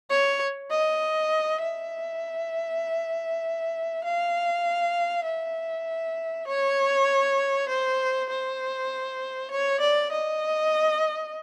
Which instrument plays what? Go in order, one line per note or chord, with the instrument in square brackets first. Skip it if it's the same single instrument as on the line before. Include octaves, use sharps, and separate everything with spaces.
[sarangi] C#5
D#5
E5
F5
E5
C#5
C5
C5
C#5
D5
D#5